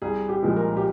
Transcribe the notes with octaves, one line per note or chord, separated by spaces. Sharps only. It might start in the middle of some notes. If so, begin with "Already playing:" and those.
C2 G#4
G4
A#2 F3 G#3
A#4
G4